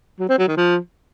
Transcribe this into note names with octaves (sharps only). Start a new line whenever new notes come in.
F#3
C4
F#3
D#3
F3